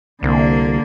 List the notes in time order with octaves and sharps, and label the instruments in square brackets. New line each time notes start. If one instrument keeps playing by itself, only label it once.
[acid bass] C2 [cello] D3 A#3